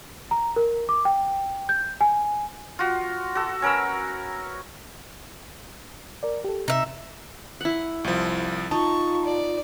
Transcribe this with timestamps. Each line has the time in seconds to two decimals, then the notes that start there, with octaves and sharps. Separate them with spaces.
0.31 A#5
0.56 A#4
0.89 D6
1.05 G5
1.69 G6
2.01 G#5
2.79 F4 F#4
3.35 F#4 A4
3.62 C#4 A#4 B4 E6
6.23 A#4 D5
6.44 G4 A4
6.68 C3 D#4 E5
7.61 E4 F#5
8.04 C2 F3
8.71 D#4 F4 A5 C#6
9.25 D5